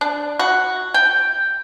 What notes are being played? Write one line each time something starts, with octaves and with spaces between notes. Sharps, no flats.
D4
F#4
G5